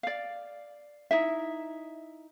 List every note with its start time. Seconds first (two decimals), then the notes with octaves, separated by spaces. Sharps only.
0.03 D5 F5
1.11 D#4 E4 E5